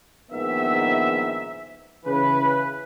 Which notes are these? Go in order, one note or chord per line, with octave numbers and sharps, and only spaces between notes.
A#1 G#2 D#3 B3 E5
C#3 E3 B4